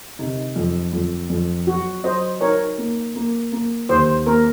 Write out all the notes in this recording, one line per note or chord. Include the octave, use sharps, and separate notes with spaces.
C3 D#4
F2
F2
F2
F#3 F#4
F#3 C5 D#5
D#4 A#4 C#5
A#3
A#3
A#3
D#2 C5
A#3 A#4